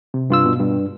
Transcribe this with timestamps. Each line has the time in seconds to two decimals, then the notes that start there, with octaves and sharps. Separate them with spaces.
0.14 C3
0.30 G2 F4 E6
0.46 B2
0.60 G2